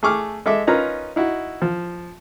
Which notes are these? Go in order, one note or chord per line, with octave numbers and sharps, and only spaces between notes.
A3 G#4 C#6 D6 F6
G#3 A4 E5 D6
C#4 D#4 F4 A#4 B4 A#5
D#4 E4 F#4
F3